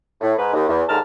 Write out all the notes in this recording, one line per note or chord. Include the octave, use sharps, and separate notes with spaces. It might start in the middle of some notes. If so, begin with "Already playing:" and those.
A2
G#2 B4
D#2
E2
D#2 G#2 D3 A#4 A5 F6